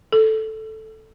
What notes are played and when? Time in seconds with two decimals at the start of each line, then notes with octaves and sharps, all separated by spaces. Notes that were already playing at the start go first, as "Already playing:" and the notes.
0.12 A4